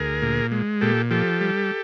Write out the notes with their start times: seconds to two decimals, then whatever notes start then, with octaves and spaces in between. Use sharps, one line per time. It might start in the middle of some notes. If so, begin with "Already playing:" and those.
Already playing: D2 G#4 A#4
0.22 A#2
0.52 G#3
0.81 A#2 G4 A4
1.11 F3 G4 A4
1.41 G3